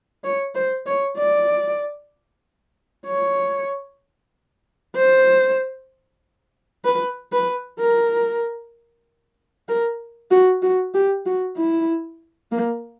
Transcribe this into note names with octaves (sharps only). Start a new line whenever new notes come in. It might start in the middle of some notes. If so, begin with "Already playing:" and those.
C#5
C5
C#5
D5
C#5
C5
B4
B4
A#4
A#4
F#4
F#4
G4
F#4
E4
A#3